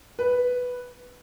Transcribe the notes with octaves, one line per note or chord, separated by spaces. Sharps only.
B4